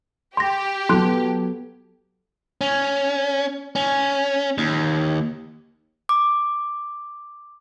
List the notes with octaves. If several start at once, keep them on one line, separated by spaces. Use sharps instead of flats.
G4 C6 A#6
F#3 B3 A4 C6 F#6
C#4
C#4
D#2
D6